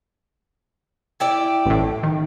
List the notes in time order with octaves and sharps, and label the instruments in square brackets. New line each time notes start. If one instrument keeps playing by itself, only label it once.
[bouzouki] E4 G4 D5
[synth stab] A1 A2
D#3